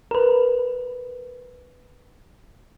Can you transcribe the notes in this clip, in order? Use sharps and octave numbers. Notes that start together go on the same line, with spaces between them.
A#4 B4